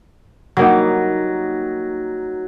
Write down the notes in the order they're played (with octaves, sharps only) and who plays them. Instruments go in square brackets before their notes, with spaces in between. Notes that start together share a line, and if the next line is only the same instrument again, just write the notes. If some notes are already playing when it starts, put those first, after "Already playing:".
[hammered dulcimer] F#3 [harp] G3 A#3 D#4